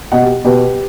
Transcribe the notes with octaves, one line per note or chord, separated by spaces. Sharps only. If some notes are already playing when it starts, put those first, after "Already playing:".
B2 D#5 F#5
G4
B2 G4 B4